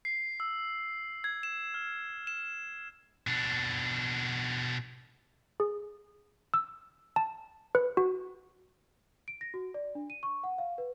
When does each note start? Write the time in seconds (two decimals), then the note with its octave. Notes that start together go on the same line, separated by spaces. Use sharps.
0.05 C7
0.40 E6
1.24 G#6
1.43 E7
1.74 F6
2.27 E7
3.27 B2 D4
5.60 G#4
6.54 E6
7.16 A5
7.75 B4
7.97 F#4
9.28 D7
9.41 A#6
9.54 F#4
9.74 D5
9.95 D4
10.10 D#7
10.23 C#6
10.44 F#5
10.58 F5
10.78 B4